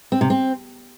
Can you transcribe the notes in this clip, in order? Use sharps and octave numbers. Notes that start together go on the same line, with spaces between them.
C4
C3
C4